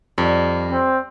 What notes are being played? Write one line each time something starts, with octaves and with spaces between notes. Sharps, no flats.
F2 G3
C4